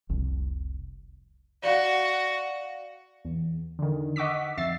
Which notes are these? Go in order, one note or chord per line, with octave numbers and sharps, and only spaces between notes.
F1 C2
F#4 D5 F5 F#5
E2
D3 D#3
D#5 F#5 C#6 D6 E6 B6
F2 E5 A6 C7